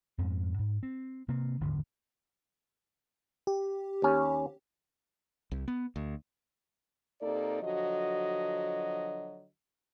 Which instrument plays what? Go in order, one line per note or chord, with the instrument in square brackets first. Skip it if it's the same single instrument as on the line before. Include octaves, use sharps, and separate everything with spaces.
[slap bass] F2 G#2 C4
G#2
C4
C3 A#3 C4
D1 G#1 E2 D3
[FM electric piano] G4
[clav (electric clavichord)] D#2 C#4
[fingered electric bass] C2
B3
D2
[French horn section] C3 A#3 D#4 A4 D5
D3 F3 F#3 F#4 D#5